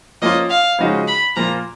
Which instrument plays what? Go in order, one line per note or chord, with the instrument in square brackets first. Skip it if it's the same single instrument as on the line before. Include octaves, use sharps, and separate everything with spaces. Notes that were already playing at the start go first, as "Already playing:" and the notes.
[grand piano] F3 A#3 C#4 F4 [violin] D#5
[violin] F5
[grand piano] C#3 F3 G#3 D#4 F#4
[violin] B5
[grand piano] A#2 F3 A#3 F4 [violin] A#5